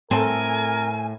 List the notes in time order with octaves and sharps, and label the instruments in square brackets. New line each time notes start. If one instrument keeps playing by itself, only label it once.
[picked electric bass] A2 [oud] C4 A4 [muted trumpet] A#4 [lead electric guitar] G#5